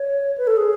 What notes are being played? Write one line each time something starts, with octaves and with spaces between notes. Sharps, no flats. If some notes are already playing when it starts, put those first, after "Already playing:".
Already playing: C#5
B4
A4
G#4